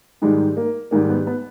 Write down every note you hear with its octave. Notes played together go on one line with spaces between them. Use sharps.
G#2 D#3 G3 G#3
A#3
G#2 D#3 G3 A#3
B3
B3